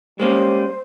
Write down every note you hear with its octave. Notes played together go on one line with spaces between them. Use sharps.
G3 G#3 A#3 C#4 C5